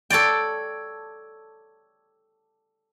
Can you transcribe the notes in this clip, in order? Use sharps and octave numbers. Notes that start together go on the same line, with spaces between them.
A4 C#5 D5 G5